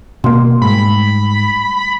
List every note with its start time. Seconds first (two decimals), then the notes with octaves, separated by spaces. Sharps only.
0.24 B2 A#3 C6
0.62 G#2 G3 A3 B5